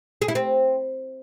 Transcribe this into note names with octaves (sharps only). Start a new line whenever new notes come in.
G#4
E4
C4